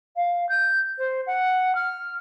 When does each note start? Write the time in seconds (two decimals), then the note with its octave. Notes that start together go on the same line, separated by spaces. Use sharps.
0.16 F5
0.49 G6
0.98 C5
1.26 F#5
1.75 F6